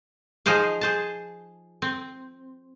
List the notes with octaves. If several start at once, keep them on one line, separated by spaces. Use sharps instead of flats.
F3 D#4 G#4 C5 F5
G#4 C5 A5
C4